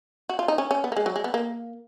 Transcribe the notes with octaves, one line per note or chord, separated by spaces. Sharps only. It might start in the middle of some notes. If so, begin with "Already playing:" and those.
F#4
F4
D#4
C#4
C#4
B3
A#3
G#3
F#3
G#3
B3
A#3